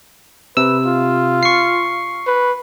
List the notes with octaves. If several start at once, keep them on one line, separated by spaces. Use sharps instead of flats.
C3 B4 E6
F4
C#6 C7
B4